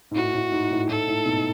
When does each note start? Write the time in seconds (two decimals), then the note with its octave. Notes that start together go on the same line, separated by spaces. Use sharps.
0.11 G#2
0.15 A2 F#4
0.34 A2
0.52 G#2
0.71 A2
0.89 A2 A4
1.08 A2
1.25 G#2 B2